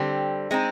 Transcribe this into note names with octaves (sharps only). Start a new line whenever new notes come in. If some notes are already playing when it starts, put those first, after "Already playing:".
Already playing: D3 G3 C4
G#3 C4 D#4